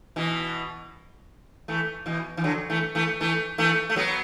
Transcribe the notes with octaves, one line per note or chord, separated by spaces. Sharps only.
B2 E3
E3 A3
B2 E3
E3
D3 F#3
E3 A3
E3 A3
E3 A3
E3 A3
A3
F#3 B3